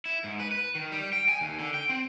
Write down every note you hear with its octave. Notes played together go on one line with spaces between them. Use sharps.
E4
G#2
B4
B4
D#3
G3
G5
G#5
D#2
D3
G5
C4